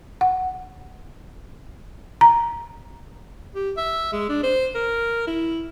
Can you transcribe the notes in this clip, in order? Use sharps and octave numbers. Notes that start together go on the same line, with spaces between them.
F#5
A#5
G4
E5
G#3
D4
C5
A#4
E4